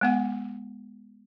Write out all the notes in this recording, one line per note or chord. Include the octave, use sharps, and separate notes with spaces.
G#3 B3 F#5